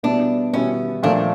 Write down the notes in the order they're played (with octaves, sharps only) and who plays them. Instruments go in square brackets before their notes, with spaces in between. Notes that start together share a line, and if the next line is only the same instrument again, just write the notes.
[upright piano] B2 G3 B3 E4 [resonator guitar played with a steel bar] D4
[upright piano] B2 G3 B3 E4 [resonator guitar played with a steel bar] C#4
[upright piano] A#2 F3 A3 [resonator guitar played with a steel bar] D4